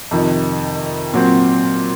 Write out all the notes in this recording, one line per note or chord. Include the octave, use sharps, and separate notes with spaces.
F2 C3 D#3
A#2 F#3 C4